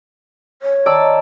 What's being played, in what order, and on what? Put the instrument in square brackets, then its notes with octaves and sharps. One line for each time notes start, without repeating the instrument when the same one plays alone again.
[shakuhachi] C#5
[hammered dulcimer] D#3 [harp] D5 A5 E6